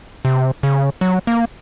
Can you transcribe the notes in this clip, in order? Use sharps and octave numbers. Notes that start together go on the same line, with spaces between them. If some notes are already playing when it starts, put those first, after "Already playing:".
C3
C#3
F#3
A#3